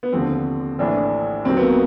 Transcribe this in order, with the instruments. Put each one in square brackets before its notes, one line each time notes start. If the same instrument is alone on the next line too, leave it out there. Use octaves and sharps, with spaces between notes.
[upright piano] B3
F1 D#2 D3 F3 C4
A#1 A2 E3 D4
D#2 D#3 F#3 C4
B3
A#3